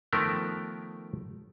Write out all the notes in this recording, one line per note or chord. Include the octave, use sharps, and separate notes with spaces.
D#3 F3 A3 B3 A#4 G5